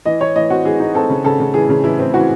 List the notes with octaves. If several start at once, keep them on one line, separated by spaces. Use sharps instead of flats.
E3 D#5
E3 C#5
E3 D#5
C4 F#4
E3 G#4
D#4
C4 A4
C#3
C#3 A4
C#3
E3 G#4
C#3
E3 E4
C4
E3 F#4